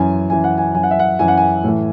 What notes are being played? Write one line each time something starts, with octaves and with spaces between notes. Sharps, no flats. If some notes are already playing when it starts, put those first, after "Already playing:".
Already playing: F#2 E3 G#5
F#2 E3 G#5
F#5
G#5
F#2 E3 G#5
F#5
E5
F#5
F#2 E3 G#5
F#5
G#5
A2 E3